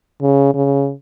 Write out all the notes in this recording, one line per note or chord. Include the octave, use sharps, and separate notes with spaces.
C#3
C#3